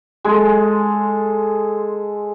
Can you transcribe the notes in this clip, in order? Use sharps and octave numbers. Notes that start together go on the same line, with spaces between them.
G#3 A4